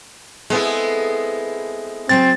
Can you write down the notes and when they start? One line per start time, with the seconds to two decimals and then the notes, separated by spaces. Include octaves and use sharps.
0.50 G#3 B3 C4 E4 A4
2.09 C#3 F#3 A#3 C4 A6